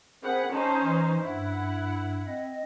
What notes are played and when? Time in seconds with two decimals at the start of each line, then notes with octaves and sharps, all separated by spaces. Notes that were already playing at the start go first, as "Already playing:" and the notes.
0.24 C4 G#4 A#4 C5 F#5 B5
0.53 C#4 D#4 C5 A5
0.83 E3
1.21 G2 E4 F#5
2.27 C4 D#5